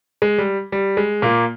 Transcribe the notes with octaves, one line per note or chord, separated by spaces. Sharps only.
G#3
G3
G3
G#3
A#2 A#3